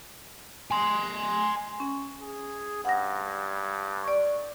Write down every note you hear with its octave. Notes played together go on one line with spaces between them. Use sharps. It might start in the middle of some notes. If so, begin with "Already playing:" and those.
G#5 C6
C#4
G#4
G2 F#5 A#6
D5 C#6